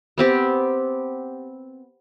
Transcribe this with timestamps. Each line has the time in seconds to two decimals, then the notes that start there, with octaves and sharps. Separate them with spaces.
0.18 B3 C4 G4